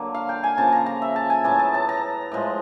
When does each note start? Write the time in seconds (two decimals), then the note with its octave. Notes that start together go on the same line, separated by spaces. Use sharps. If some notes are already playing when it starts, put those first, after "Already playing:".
Already playing: D3 F#3 A#3
0.15 F5
0.29 G5
0.43 G#5
0.57 C#3 F3 A#3 A5
0.72 A#5
0.86 A#5
1.02 E5
1.16 A5
1.30 G#5
1.44 A2 F#3 B3 A5
1.59 A5
1.74 A5
1.89 A#5
2.32 A2 F3 G#3